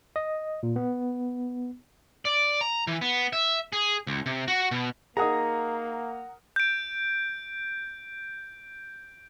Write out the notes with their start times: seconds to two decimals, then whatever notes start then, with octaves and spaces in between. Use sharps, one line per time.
0.16 D#5
0.63 A#2
0.76 B3
2.25 D5
2.61 A#5
2.87 E3
3.01 B3
3.33 E5
3.73 G#4
4.07 C#2
4.26 C3
4.48 F#4
4.71 B2
5.17 A#3 D#4 G#4 A#4 F#5 A#5 D#6
6.56 G6 D7